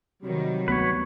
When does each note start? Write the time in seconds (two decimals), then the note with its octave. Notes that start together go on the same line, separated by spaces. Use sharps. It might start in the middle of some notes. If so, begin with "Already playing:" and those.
0.23 C3 D#3 F#3 G3
0.68 D2 B3 B4 C#5